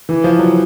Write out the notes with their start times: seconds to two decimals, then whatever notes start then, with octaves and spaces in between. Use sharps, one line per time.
0.09 E3
0.24 F3
0.39 F#3